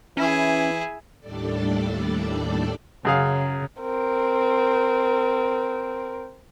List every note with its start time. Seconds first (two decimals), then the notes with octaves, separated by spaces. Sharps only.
0.17 E3 C#4 E4 G#4
1.20 D#2 A2 G3 D4 A4 D5
3.05 F#2 C#3 G#4 F5
3.81 C4 A#4